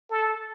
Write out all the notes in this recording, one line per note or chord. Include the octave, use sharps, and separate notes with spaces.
A4